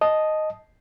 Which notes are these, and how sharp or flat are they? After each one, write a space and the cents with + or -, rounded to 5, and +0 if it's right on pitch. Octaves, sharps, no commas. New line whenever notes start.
D#5 +0 A5 -15